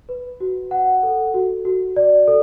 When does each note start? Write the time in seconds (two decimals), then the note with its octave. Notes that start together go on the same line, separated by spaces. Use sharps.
0.09 B4
0.40 F#4
0.71 F#5
1.03 A4
1.34 F#4
1.65 F#4
1.96 D5
2.28 A4